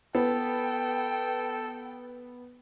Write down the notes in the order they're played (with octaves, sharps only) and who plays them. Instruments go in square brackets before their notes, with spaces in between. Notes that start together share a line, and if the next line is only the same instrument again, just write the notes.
[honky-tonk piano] B3 [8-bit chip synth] A4 [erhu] G5